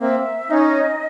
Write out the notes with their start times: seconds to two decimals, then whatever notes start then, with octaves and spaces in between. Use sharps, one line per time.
0.01 A#3 C4 E5
0.50 C#4 D#4 D#5